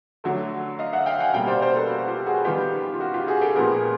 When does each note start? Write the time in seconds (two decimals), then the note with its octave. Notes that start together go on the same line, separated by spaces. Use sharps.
0.24 D3 F#3 A3
0.79 D#5 F5
0.93 E5 F#5
1.06 F5 G5
1.20 F#5 G#5
1.34 B2 G3 A#3 F5 G5
1.48 C5 D5
1.62 A#4 C5
1.76 A4 B4
1.89 F#4
2.07 F4 G4
2.26 F#4 G#4
2.45 D#3 G3 B3 F4 G4
2.94 F4
3.00 F#4
3.14 F4 G4
3.27 F#4 G#4
3.42 G4 A4
3.55 A#2 F3 G#3 B3 G#4 A#4